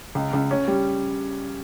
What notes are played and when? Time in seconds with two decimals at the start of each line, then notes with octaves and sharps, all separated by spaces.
0.15 C#2
0.33 C#2
0.51 C#4
0.68 G3